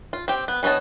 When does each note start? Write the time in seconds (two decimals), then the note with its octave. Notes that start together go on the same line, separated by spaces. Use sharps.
0.13 F4
0.28 C4 G4
0.48 B3
0.63 E3 B3 C#5 D#5 A5